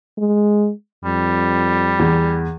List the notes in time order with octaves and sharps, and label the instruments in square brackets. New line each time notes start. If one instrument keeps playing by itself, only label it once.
[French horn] G#3
[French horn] F2 [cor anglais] G3
[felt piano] E2